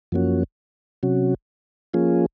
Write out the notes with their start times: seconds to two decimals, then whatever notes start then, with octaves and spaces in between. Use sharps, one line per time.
0.12 F#2 F3 A#3 C#4 F#4
1.03 C3 F#3 C#4 F#4
1.94 F3 A#3 C#4 F4 G#4